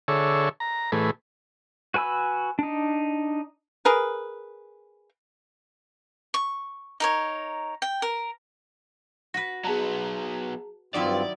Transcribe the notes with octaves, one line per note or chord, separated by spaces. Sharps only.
D3 G#4 A4 C#5 E5
A#5
A2 E3 A3 G#4 B4
F#4 B4 G#5 B5 E6
D4 D#4
G#4 A#4 B4
C#6
D#4 A#4 C#5
G5
A#4
F#4 B4 A#6
F#3 B3 G#4 A5 A#5
G2 D#3 F#3 C4 E4 F4 D5 D6